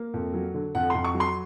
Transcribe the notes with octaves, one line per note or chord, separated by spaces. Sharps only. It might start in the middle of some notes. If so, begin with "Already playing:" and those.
Already playing: A#3
F2
F#3
D3
F2 F#5
F2 C6
C#6
F#3
C6